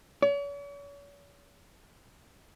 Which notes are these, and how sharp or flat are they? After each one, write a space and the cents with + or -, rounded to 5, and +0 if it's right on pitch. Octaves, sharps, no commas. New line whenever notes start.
C#5 +45